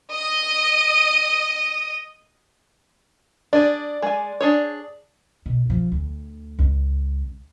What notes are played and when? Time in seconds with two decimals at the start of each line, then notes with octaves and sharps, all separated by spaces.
0.12 D#5 D#6
3.53 D4 G#4 D5
4.02 G#3 G#5
4.41 D4 G#4 C#5
5.46 B2
5.66 F3 F#3
5.92 D2
6.59 C#2